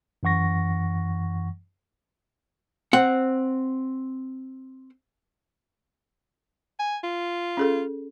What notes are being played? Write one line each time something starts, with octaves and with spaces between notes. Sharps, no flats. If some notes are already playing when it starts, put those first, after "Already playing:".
F#2 E3 F#5 C#6 A#6
C4 F#5
G#5
F4
C#4 G#4 A4